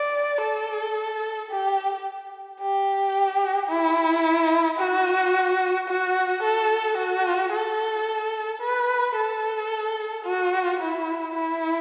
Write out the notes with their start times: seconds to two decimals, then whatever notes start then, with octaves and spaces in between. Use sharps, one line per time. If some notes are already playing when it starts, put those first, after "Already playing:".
Already playing: D5
0.42 A4
1.51 G4
2.61 G4
3.69 E4
4.79 F#4
5.89 F#4
6.43 A4
6.97 F#4
7.52 A4
8.61 B4
9.16 A4
10.24 F#4
10.79 E4
11.34 E4